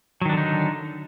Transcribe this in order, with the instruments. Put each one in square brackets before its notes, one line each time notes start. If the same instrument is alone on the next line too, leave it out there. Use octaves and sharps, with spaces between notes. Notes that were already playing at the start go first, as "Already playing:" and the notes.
[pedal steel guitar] F#3
D#3
D4
D3
D#4